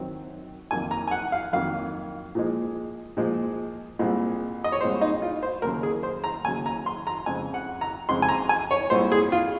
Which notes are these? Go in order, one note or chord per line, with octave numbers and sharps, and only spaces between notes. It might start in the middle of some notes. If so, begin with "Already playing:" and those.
Already playing: F#2 D#3 F#3 C4
F2 D#3 F#3 A#3 G#5
A#5
G#5
F#5
F5
F2 D#3 F#3 A#3 F5
A#2 F3 G#3
A#2 F3 G#3
C2 A#2 G#3 C4
D#5
C#5
C2 A#2 G#3 C4 C5
D#4
F4
C5
D#2 C#3 F#3 A#4
G#4
C5
A#5
D#2 C#3 F#3 G#5
A#5
C6
A#5
F2 C#3 G#3 C4 G#5
F#5
A#5
F2 C#3 G#3 C4 C6
G#5
A#5
G#5
C#5
C2 A#2 G#3 C4 C5
G#4
F4